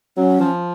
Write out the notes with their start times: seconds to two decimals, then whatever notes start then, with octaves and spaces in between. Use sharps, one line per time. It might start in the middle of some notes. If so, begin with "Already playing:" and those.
0.17 F#3 C#4
0.40 F3